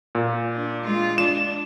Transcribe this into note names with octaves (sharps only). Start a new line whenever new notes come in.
A#2
D4
G#3 F4
D4 E7